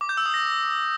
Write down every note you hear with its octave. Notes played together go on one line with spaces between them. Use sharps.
D6
G6
E6
D#6
A#6